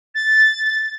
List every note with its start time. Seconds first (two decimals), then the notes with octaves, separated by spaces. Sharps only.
0.15 A6